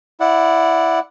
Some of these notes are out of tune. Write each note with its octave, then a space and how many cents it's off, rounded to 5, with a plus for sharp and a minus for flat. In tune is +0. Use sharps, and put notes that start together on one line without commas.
E4 +5 D5 +0 F#5 -10